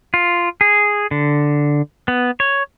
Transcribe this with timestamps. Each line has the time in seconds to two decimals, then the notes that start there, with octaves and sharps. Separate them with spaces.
0.14 F4
0.61 G#4
1.11 D3
2.08 B3
2.40 C#5